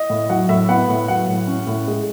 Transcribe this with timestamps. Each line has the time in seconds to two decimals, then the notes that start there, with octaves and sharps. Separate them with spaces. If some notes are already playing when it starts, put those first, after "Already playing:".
Already playing: D#5
0.10 A2
0.29 F#3 F#5
0.49 A2 E5
0.68 B3 F#5
0.89 A2
1.08 F#3 F#5
1.28 A2
1.47 C#4
1.67 A2
1.88 G#3